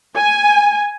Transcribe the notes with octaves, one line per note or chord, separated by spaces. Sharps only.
G#5